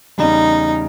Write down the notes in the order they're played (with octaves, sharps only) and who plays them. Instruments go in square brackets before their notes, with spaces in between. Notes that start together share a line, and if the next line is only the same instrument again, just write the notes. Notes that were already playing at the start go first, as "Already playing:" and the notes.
[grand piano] E2 C#3 G3 [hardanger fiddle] D#4